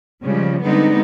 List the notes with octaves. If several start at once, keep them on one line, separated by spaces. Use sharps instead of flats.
C#3 F3 G3 G#3
D3 G3 G#3 B3 C4 D#4